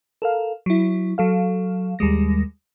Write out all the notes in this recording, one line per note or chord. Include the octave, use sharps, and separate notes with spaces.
A4 A#4 F5
F#3 E4
F#3 A4 F5
D#2 G3 G#3 A#6